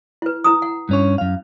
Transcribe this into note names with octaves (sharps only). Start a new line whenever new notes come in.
E4 B4
E4 A#5 D#6
F#5
G2 C#4 C#5
F#2 F5